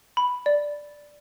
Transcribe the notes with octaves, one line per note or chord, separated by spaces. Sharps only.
B5
D5